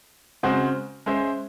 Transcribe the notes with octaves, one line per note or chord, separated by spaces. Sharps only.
C#3 G#3 C4 F#4 C5
G#3 C#4 G#4 C5 E5